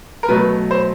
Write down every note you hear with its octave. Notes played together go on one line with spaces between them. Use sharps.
A#4
B2 F#3 A3 B4
C5